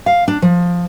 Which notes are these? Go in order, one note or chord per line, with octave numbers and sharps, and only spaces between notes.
F5
D4
F3